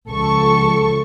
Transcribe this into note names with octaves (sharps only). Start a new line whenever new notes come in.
C#2 F3 A4 C#6